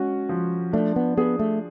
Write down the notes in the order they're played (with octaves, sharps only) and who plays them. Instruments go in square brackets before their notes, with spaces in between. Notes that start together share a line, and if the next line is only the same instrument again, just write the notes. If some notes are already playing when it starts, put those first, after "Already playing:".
Already playing: [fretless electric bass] G#3 [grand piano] C#4 F#4
[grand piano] F3
[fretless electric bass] A3 [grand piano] D4
[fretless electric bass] B3
[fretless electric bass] B3 [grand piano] G#4
[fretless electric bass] A3